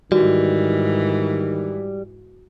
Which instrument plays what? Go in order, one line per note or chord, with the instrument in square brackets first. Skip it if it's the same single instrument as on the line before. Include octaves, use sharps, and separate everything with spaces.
[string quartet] G#2 E3 [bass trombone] D#3 [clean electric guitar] G3 [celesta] F#4